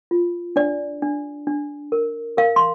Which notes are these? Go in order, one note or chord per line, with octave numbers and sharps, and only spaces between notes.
F4
D4 D5
D4
D4
A#4
A#4 F5
C6